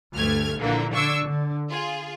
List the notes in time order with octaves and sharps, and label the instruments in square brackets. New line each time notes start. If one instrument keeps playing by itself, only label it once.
[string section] D2 G2 A3 F6 G#6
A#1 D3 E3 A#3
D3 D4 C#6 E6 G#6 C#7
D3
F4 G#4